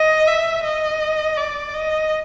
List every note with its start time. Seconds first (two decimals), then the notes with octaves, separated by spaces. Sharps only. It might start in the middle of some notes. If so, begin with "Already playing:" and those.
Already playing: D#5
0.28 E5
0.64 D#5
1.38 D5
1.75 D#5